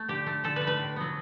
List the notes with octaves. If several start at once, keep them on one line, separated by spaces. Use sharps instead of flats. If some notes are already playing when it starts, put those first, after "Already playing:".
Already playing: A3
D3 G4
A3
D3 A4
B4
A3
B4
A2
F#3 B3